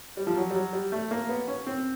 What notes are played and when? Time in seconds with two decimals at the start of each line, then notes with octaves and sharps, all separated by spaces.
0.17 G3
0.27 F3
0.36 F#3
0.50 G3
0.55 F#3
0.73 G3
0.92 A3
1.11 A#3
1.29 B3
1.48 C#4
1.67 C4